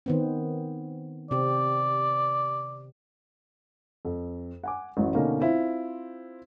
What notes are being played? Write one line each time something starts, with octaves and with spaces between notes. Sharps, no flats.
D#3 B3 C4
C3 C4 G4 D5
F2
F#5 G#5 D6
A1 F#2 F#3
B2 D3 A#3 C#4 D#4
C4 E4 F4